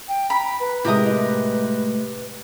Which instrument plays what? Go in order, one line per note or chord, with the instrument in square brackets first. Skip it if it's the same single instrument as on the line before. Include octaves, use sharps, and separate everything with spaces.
[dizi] G5
[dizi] A#5 [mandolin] B5
[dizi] B4
[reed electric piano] A2 C3 G#3 [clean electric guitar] E4 E5 [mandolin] G4 A#4 D#6
[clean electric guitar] A3 D#5